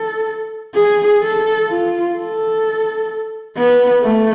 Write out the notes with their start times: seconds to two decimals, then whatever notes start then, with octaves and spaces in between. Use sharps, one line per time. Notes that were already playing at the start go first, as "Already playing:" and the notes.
Already playing: A4
0.75 G#4
1.23 A4
1.70 F4
2.16 A4
3.57 B3
4.03 A3